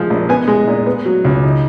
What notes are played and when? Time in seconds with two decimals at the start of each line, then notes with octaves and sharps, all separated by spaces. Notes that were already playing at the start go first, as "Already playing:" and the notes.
Already playing: F3 G#3
0.10 A#1
0.29 B3 G#5
0.48 G#3
0.67 A#2
0.86 B3
1.05 F#3
1.25 C#2
1.43 D#4